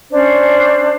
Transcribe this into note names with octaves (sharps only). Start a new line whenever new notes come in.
C#4 D4 C5